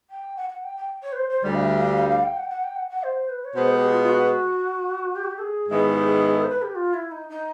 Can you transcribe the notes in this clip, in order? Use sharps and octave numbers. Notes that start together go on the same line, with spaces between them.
G5
F#5
F#5
G5
G5
C#5
B4
C5
C5
D2 D3 G3 D5
F5
E5
F5
F5
F5
G5
F#5
G5
F#5
G5
F#5
F#5
C5
B4
C#5
B2 G#3 B3 C5
G4
F4
F4
F#4
G4
F#4
G4
A4
G#4
G#2 D#3 G#3 B3 E4 G#4
G4
G#4
G#4
A4
C5
B4
G4
F4
E4
D#4
D#4